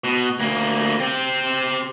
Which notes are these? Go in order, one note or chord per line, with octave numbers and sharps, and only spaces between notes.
B2
D2 A#3
C4 G4